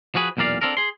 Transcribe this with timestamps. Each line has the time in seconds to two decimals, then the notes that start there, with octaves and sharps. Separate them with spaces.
0.15 F3 F#4 G#4 B4
0.37 B1 E2 A#2 A#4 D5 F5
0.61 C4 D4 F4 A4 A#4
0.77 G#4 C6